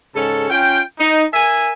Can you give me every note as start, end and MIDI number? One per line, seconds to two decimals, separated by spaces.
0.14 0.46 44
0.14 0.46 49
0.14 0.46 61
0.14 0.46 69
0.50 0.80 61
0.50 0.80 65
0.50 0.80 79
0.99 1.24 63
1.34 1.71 70
1.34 1.71 76
1.34 1.71 80